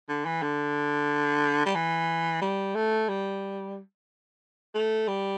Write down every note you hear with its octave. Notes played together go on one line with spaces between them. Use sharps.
D3
E3
D3
G3
E3
G3
A3
G3
A3
G3